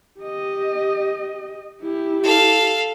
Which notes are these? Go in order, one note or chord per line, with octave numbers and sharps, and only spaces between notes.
G4 D#5
E4 G4
A4 F5